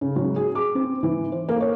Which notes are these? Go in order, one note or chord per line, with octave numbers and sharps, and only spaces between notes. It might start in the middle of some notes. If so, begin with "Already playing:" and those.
C#3
F#3
G#4
D6
C4
E3
C5
A#3
C#5